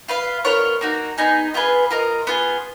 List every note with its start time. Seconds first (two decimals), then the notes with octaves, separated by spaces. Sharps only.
0.09 F4 B4 F5
0.44 B3 F4 A#4 C#5
0.81 A#3 D#4 F#4
1.18 B3 D#4 G#4
1.54 B3 F4 G#4 B4
1.91 F4 A#4 D#5
2.27 B3 F4 G#4